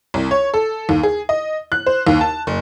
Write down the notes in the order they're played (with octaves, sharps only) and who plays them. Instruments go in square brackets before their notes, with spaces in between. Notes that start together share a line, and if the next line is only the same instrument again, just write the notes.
[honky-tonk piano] C2
C#5
A4
D#2
G#4
D#5
F#6
C5
D#2
A5
F#1